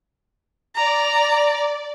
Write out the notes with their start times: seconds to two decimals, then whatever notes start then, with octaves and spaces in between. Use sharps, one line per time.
0.76 D5 A#5